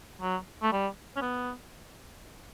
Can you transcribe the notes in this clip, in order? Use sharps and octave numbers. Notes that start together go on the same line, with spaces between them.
F#3
A3
G3
C#4
B3